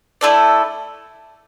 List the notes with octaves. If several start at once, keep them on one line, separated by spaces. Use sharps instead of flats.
A3 E4 A4 D5